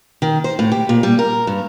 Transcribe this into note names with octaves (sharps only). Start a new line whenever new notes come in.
D#3
C5
A2
G4
A#2
G3
A#4
G2